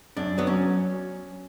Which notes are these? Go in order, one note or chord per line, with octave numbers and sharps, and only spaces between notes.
F#2 D4
F#3 B3
C#4